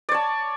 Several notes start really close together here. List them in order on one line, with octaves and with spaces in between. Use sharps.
D5 C#5 A5